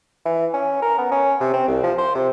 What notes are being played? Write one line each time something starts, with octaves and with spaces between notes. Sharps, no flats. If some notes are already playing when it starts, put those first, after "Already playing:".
E3
C#4
A#4
B3
C#4
C3
C4
C2
F3
C5
C3